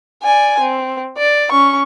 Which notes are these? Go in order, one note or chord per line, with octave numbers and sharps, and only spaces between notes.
D5 G#5
C4
D5
C#4 C#6